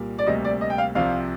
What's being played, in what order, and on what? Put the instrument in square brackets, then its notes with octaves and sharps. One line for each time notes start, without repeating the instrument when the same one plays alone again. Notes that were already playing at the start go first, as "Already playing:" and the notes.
Already playing: [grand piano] C2 A#2 G3 A#3
[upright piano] D5
[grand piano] D2 C3 G3 A#3 [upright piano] D#5
[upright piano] D5
D#5
G5
F5
[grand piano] C2 C3 F3 C4 [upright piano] F5